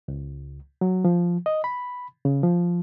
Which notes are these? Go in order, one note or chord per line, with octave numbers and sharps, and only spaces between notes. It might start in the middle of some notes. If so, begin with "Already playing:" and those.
C#2
F#3
F3
D#5
B5
C#3
F3